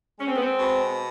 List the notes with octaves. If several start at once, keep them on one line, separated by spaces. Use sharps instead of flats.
G#3 C#4
C4
B3
C4
B2